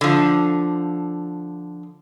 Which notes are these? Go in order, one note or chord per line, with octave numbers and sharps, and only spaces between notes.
D3 F3